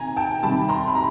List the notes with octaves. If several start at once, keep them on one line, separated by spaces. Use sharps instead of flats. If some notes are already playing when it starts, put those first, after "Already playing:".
Already playing: C3 D#3 G#5 A#5
G5 A5
C3 D#3 G3 A5 B5
A#5 C6
B5
A#5